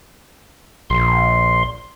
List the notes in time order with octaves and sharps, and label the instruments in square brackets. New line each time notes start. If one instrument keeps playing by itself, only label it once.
[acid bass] A#1 [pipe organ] C6